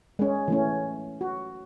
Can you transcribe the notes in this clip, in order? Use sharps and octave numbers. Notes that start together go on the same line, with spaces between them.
G#3 C#4
E3 A3 C#4
F#4